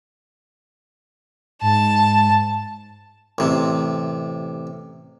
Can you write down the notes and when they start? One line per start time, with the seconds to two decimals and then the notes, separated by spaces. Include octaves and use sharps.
1.61 G#2 A5
3.38 A1 C3